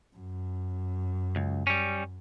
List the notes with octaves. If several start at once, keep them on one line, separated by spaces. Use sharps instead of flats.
F#2
C#2
G3 C#4